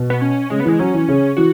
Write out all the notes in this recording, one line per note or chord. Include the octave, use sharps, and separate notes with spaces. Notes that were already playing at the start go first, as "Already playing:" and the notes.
Already playing: B2
B3
C#4
C#3 G#3
B3
E3 G#3
F#3 C#4
E3
C#3
E3 F#4